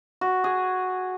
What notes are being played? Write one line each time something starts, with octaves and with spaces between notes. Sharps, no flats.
F#4
G#4